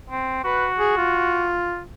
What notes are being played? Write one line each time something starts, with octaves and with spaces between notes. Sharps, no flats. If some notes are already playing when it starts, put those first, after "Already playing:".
C4
F#4 B4
G#4
F4